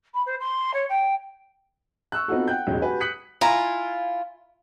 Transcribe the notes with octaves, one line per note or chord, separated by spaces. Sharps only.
B5
C5
C6
C#5
G5
C#6 E6 F#6
B3 C4 D#4 F4 F#4 A4
F#5 G5 F#6 G6
E1 A1 F#3 G#3 D#4
F#4 G4 B4 G#5
D#6 F#6 B6 C#7 F#7
E4 F4 G#5 A#5